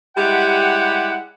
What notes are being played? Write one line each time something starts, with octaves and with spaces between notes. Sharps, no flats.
G3 G#3 E4 G4 F#5